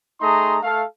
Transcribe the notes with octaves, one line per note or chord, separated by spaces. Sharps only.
A3 D#4 G#4 A#5 C6 D#6
A3 A4 F5